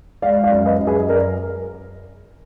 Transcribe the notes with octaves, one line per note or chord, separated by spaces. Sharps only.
G#3 D5 F5
D5 F5
F#2
B4 D#5
F#2
G#4 B4
F#2 A#4 D5